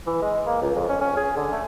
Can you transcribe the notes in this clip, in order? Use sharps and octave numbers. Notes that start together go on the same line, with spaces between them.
E3
G#3
A#3
C#2
F2
C#4
C#4
G#4
D3
A3